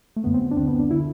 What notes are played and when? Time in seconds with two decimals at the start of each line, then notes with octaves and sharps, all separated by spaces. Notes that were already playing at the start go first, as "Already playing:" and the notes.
0.16 A3
0.24 F#2 D3 B3
0.34 C4
0.51 D4
0.56 D2 D3 C4
0.68 B3
0.79 D4
0.91 D3 E4